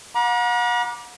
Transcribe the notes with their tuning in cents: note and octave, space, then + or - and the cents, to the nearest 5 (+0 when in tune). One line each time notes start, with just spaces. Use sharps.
F#5 -40 A#5 +45 D6 +0